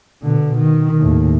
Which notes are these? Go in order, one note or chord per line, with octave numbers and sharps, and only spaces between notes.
B2 D3
D#3
D#2 A2